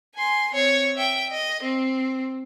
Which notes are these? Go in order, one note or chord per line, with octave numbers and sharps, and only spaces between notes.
G#5 C6
C4 C#5
E5 G5
D#5
C4